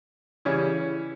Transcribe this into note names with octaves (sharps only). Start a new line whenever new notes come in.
C#3 E3 G3 C#4 E4